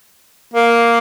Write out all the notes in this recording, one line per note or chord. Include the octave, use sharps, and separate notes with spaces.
A#3